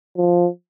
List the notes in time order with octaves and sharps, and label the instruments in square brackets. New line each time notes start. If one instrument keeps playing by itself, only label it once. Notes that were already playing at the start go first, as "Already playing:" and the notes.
[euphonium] F3